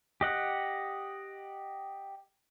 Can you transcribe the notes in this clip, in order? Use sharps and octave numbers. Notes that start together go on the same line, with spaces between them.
G4 D#5 F#5